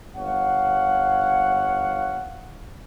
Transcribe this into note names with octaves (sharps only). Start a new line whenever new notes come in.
G1 C#5 F5 F#5